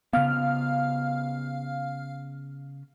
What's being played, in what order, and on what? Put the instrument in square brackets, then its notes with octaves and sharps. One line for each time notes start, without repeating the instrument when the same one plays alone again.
[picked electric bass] C#3 B3 [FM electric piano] F5 F6